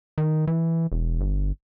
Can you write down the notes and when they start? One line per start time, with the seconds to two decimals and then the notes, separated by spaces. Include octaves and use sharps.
0.18 D#3
0.47 E3
0.92 E1
1.21 G1